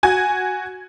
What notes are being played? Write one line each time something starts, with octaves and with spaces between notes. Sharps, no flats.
F#4 G#5 G#6